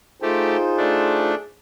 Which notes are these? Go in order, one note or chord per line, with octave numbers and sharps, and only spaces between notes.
A3 D#4 F4 G4 G#4 C5
A3 D4